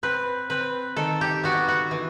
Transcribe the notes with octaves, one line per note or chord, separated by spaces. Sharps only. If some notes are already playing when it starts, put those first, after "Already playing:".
C4 B4
C4 B4
D#3 A4
G4
B3 F#4
F#4
E3